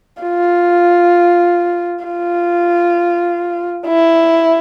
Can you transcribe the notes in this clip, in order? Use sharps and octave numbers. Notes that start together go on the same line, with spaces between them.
F4
F4
E4